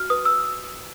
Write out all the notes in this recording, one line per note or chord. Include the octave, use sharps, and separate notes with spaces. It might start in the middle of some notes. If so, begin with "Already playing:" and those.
Already playing: F#4 F6
B4 D#6
E6